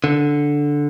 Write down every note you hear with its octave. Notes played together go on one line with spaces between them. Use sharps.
D3